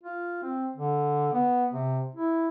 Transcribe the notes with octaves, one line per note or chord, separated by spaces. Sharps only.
F4
C4
D3
B3
C3
E4